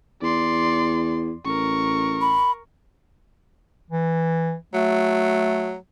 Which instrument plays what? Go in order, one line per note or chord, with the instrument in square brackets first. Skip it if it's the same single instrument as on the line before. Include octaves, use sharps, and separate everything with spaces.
[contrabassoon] E2 [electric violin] D5 C6
[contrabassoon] A1 [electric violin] A#4 C#6
[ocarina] B5
[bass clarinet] E3
[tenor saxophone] F#3 [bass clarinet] A3